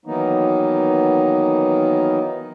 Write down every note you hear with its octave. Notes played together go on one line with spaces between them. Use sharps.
D#3 E3 F#3 A#3 B3 D#4